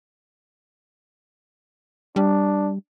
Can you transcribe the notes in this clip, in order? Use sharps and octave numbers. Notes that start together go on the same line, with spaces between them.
G3 D4